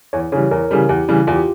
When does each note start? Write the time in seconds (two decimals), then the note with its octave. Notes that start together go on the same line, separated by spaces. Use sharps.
0.13 E2 C#5
0.32 C#3 E3 G3 C#5
0.51 E2 A#4
0.71 C#3 E3 G3
0.89 E2 G4
1.08 C#3 E3 G3
1.27 E2 F4
1.36 G4